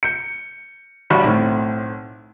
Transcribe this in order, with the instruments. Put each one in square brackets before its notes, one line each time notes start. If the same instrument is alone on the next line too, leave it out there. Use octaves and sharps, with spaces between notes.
[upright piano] G6 C#7
[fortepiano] A1 G3 F#4
[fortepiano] B1 [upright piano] A2 C4